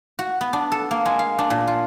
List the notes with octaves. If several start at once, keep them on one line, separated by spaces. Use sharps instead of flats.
F#4
B3
D4
A4
A#3
G#3
F5
D4
A#2
F4